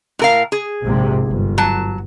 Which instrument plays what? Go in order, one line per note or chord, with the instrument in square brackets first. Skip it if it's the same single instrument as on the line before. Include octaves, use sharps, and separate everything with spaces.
[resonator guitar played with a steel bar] A2 A#4 F5
G#4
[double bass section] A#1 G#2 C3
G1
[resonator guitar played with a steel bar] F#3 A5